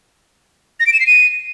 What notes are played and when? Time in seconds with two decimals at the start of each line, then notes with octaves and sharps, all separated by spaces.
0.80 A#6
0.87 D7
0.93 E7
1.00 C7
1.07 D#7